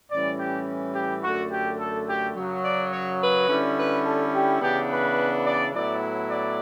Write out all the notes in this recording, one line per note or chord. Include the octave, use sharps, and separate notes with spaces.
A2 E3 G3 C#4 D5
G4
G4
F#2 D3 A3 F#4
G4
A4
G4
F#2 C#3 F#3
D5
C#5
B4
D3 G3 C#4 E4
B4
A4
G4
C#3 E3 B3 D4 G4
B4
D5
A2 F#3 B3 E4 D5
D5